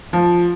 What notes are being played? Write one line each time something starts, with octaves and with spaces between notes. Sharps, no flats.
F3